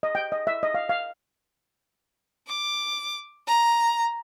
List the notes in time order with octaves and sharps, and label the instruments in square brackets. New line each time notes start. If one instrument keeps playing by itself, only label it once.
[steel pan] D#5
G5
D#5
E5
D#5
F5
F5
[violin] D6
A#5